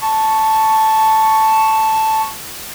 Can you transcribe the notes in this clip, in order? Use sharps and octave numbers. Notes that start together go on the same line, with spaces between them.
A5 C#6